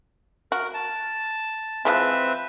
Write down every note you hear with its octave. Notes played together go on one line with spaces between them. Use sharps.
F#4 A#4
A5
E3 F3 G#3 C4 B4 E5